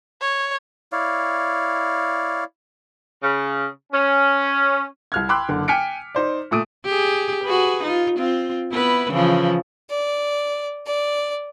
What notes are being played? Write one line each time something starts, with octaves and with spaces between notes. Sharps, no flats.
C#5
E4 C#5 D5 F5
C#3
C#4
C2 F6 G#6
G5 B5 C6 D6 E6 F#6
F#1 D3
G5 G#5 F6 B6 C#7 D7
D#4 C5 D5
A#2 A3 D#6 D7
G4 G#4
F#4 G#4 B4
D#4 F4
C4 F4
B3 E4 B4
C#3 E3 F3
D5
D5